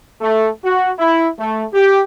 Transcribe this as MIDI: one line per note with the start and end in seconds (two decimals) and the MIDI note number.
0.21 0.48 57
0.64 0.92 66
0.98 1.28 64
1.39 1.63 57
1.73 2.02 67